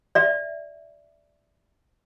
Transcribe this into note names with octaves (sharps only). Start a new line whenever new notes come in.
D5 E5